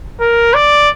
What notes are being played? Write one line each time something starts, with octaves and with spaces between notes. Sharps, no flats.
A#4
D5